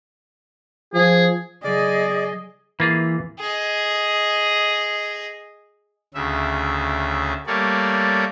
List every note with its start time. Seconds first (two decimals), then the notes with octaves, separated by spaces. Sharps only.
0.94 F3 G#4
1.64 C#3 F#3 G#4 D5 D#5
2.80 E3 A#3 F4 G#4
3.39 G#4 D#5
6.14 D2 C#3 E5
7.47 G3 A3 A#3 C#5 D5